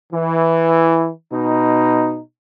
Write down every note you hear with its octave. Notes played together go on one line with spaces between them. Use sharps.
E3
B2 D#4